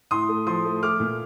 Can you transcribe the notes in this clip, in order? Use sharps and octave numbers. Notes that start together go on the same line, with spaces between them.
A2 C6 D#6
A3
F3 C6 D#6
A3
A3 D6 F6
A#2